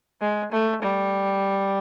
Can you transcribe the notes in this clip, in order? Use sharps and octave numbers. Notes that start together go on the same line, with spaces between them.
G#3
A3
G3